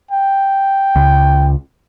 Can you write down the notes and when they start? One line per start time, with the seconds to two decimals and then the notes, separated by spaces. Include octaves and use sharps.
0.11 G5
0.96 C#2